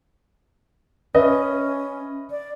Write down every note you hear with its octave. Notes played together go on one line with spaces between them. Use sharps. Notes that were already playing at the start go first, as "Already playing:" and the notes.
C#4 B4 D#5 E5
D5